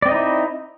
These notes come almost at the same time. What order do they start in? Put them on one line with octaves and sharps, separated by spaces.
D5 C4 D#5 D#4 E4